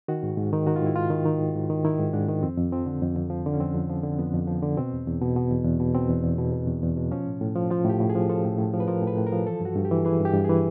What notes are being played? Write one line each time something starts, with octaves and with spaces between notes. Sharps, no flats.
D#3 F#4
G#2
G#2
D#3
D#3 F#4
F4
G#2 E4
G#2 F4
D#3
D#3
G#2
G#2
D#3
D#3 E4
G#2
G#2 D4
D#3
F2 C4
F2
F3 C4
D3
F2
F2
F3
D3
C#4
F2 C4
F2
F3
D3
F2 B3
F2
F3
D3
B2 C4
E2
E2
B2
B2
E2
E2
B2
B2 C4
E2
E2
B2
B2
E2
E2
B2
F3 C#4
A2
A2
F3
F3 F4
A2 G4
A2
G#4
F3
F3 A4
A2
A2
F3
B4
F3 A#4
A2 B4
A2
A#4
F3
E3 A4
G2 F#4
G2
G4
E3
E3 G#4
G2
G4
G2
E3 G#4